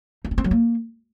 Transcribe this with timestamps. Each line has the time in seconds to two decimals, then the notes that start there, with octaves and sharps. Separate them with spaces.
0.25 D#4
0.31 D4
0.38 C4
0.44 F#3
0.51 A#3